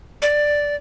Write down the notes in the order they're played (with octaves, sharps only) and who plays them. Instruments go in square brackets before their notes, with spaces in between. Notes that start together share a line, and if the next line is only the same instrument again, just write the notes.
[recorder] D5